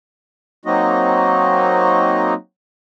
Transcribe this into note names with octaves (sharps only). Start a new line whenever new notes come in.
F#3 A#3 C4 D#4 F#4 D#5